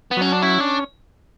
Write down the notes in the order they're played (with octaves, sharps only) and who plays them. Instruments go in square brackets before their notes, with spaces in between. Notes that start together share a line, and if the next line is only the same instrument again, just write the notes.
[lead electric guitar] B3
[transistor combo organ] F#3 [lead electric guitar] C#4
[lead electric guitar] D4
[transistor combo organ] C#4 [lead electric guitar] E4
[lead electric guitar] D4